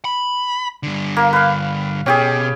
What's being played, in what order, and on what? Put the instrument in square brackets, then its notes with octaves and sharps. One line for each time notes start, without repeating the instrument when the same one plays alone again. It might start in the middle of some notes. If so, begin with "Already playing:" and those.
[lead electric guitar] B5
G2 D3
[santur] A#3
B4 F5
[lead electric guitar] B2 [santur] C#4 G4 G#4